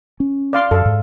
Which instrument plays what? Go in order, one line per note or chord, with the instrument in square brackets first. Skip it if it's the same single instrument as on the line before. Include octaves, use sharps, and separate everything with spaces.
[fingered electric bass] C#4
[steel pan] D5 F5 C6
[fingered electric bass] F#2 [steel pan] A4 F5
[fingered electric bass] G#2